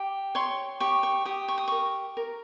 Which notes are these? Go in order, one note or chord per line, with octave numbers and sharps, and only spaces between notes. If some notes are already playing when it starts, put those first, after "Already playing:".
Already playing: G4
C#5 C6
G4 C#6
C#6
G4 D#6
C#6
D#6
A#4 C#6
A#4